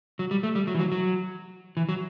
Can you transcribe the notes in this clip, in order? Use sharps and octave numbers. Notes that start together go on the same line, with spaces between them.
F#3
G3
A3
G3
F#3
E3
F#3
F#3
E3
F#3